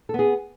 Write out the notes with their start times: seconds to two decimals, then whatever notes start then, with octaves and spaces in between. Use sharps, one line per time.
0.09 A4
0.14 B3
0.19 G#4